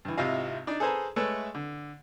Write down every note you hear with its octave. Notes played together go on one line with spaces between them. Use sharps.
G2 E3
G#1 C3 E4 F4 D#5 F5
D4 D#4 D5
G#4 A4 B4 C5 G#5 A#5
G#3 A3 A4 B4 C#5 E5
D3